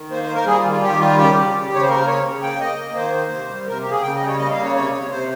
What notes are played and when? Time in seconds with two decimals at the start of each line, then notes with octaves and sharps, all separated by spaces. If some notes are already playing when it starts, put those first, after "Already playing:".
Already playing: D#3
0.10 A#3 C5
0.23 C5
0.29 A#3
0.34 A#4
0.46 G3 G#4
0.59 F4
0.64 D#3
0.71 F4
0.82 D#3 G4
1.00 G3 F4
1.17 C#3 G4
1.36 C#3
1.53 C#3
1.72 C#3 C#5
1.82 C5
1.89 A#3 A#4
2.07 C#3 C#5
2.24 C#3
2.43 A#3 G5
2.60 A#3 D#5
2.78 A#3
2.96 D#3 C5
3.14 A#3
3.31 C3
3.50 G3
3.67 C3 A#4
3.80 G4
3.85 A#3
3.91 G#4
4.03 C#3 G5
4.15 D#5
4.21 G3
4.26 C#5
4.39 A#3 D#5
4.51 F5
4.57 C#3
4.63 C#5
4.75 C3 C#5
4.93 C3
5.10 C3 C5